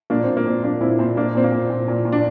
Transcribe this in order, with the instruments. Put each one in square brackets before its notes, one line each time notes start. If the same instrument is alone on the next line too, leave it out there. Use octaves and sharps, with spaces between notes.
[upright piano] A#2 A#3 D4
C4
A#2
A#3
A#2 C4
A#2 A#3 D4
A#2 C4 E4
A#2 C4 E4
A#2 A#3 D4
A#2 C4
A#3
A#2
A#2
A#2
A#2
D4